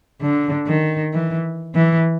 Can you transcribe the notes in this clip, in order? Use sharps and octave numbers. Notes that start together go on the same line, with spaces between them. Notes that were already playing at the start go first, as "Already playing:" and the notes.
D3
D#3
E3
E3